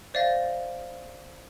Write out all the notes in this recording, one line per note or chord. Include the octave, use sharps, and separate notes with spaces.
C5 D5 E5 F5 A6 A#6